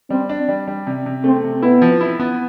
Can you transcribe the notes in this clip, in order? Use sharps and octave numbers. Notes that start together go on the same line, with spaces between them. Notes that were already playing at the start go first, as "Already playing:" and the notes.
G3 C4
D4
G3
G3
C3
C3
A3 C4
C3
B3 E4
F3
E4
B3